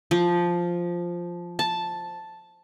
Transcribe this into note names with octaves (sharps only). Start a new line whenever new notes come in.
F3
A5